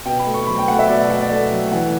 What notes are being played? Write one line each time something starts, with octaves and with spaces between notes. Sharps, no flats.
B2 G5
B5
A3
C#6
F#3 B5
G5
A3 F#5
E5
B2 D5
B2 F#5
D5
A3
F#3
E3 F#5